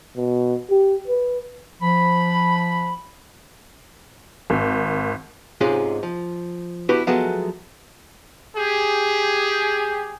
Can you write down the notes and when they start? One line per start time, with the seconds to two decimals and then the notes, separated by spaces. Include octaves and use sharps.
0.16 B2
0.70 G4
1.07 B4
1.82 F3 B5
4.50 G#1
5.61 G#2 C3 G#3 C#4 F4 G#4
6.03 F3
6.89 B3 D4 E4 F#4 G4 B4
7.07 F3 F#3 G#3 A3 B3 F#4
8.56 G4 G#4